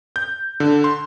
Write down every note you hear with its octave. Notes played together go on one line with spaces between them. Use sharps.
G6
D3
C6